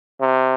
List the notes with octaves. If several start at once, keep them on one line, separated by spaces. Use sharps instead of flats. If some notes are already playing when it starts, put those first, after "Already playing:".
C3